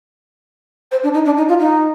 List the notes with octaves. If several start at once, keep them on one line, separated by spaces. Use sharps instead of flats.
C5
D4
D#4
D4
D#4
F4
D#4